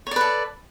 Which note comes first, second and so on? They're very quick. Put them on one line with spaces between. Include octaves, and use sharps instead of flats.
C#5 D5 B4 A4